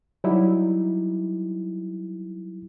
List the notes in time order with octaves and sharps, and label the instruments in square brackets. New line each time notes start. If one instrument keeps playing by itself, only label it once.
[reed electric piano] F#3 G3 D#4 E4 G4